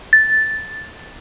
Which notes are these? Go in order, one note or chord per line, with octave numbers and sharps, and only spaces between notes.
A6